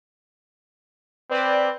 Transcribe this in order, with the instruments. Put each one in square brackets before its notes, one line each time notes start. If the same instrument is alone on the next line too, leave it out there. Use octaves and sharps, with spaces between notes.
[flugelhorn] C4 [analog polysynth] B4 D5